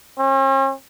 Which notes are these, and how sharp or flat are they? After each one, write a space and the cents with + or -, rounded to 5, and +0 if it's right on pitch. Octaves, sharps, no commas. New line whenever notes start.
C#4 -45